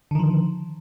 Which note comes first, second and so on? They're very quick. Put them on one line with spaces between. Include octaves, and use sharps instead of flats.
D3 D#3 F3